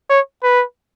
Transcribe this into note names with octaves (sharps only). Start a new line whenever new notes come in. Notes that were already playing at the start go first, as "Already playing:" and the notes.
C#5
B4